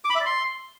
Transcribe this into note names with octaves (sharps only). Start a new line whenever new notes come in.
D6
B5
E5
D5
C6